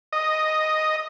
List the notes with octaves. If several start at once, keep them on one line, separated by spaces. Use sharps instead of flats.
D#5